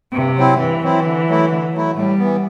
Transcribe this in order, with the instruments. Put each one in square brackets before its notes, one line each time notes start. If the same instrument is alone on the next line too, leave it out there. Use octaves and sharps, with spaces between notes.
[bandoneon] G2 [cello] C3
[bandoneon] F#3 C4 E4
[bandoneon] G2 [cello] E3
[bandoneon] F#3 C4 E4
D3
F#3 A3 E4
D3
F#3 A3 E4
[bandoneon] A2 [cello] G3
[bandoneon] E3 B3